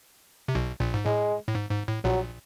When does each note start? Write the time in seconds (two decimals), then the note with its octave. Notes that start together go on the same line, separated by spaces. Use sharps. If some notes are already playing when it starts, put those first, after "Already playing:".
0.48 C3
0.55 B1 B2
0.80 A#1 A#2
0.94 G#2
1.05 A2 G#3
1.49 A2
1.55 G#2
1.71 G#2
1.88 A2
2.04 A#1 A#2 F#3